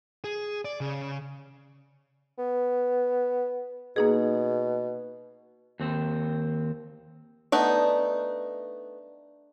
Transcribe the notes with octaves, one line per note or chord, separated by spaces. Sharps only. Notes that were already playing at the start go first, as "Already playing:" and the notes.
G#4
D5
C#3
B3
B2 A#3 D#4 G#4
D#2 C4
A3 B3 D4 D#4